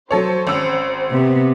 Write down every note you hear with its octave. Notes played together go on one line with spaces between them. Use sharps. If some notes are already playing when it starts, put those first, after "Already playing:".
F#3 A4 C5 C#5
G#1 C#4 E6
C3 B3